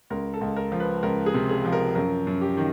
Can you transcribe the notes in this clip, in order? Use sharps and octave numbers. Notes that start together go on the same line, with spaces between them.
C#2 A#4
A4
C#2
A#4
F3
B4
C#2 A#4
G#4
C3
G#4
F3
A#4
F#2 A#4
F#2
G4
D#3